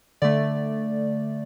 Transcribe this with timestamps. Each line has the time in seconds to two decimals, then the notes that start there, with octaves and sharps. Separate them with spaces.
0.22 D3 A3 D5